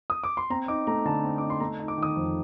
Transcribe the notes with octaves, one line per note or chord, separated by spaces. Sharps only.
D#6
D6
C6
C4 A#5
D#4 D6
A3 A#5
D3 A5
C4
D#4 D6
C6
A3 A#5
D#4
D6
D#3 D#6
F2